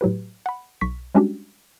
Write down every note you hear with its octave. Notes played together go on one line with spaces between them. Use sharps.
A2 F#3 G4 B4
F#5 B5
B1 C#6 B6
G3 G#3 C#4 D4 F#4 G4